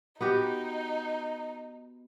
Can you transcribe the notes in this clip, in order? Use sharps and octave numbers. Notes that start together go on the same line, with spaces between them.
B3 D#4 F#4 G4